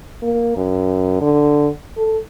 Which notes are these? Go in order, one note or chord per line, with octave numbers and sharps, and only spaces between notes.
A#3
F#2
D3
A4